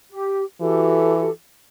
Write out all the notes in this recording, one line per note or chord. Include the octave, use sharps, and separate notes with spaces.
G4
E3 F#4 G4 A4